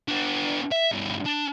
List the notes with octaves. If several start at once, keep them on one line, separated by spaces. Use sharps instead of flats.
B3 D4
E5
D2 G2
D4